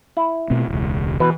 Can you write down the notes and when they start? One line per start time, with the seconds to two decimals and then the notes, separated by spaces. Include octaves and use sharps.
0.17 E4
0.50 B2 A3 C4
0.68 E1 C#2
1.20 B2 E3 B4